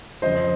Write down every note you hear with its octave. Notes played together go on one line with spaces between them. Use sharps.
F2 C#3 F3 C5 D#5